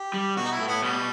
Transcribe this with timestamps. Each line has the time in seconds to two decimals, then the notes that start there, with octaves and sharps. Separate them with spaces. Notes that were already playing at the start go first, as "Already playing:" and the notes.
Already playing: G4
0.14 G3
0.36 B2 F#4
0.45 D#4
0.52 E4
0.60 A2
0.68 B3
0.82 B2 G3